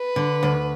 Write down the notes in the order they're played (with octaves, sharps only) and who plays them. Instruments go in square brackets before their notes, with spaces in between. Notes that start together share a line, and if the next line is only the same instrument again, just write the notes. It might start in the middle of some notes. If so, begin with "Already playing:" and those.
Already playing: [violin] B4
[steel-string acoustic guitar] D3
D2